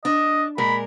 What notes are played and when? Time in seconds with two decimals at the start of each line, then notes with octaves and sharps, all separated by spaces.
0.05 D4 D#5
0.58 A#2 G#3 A#4 B5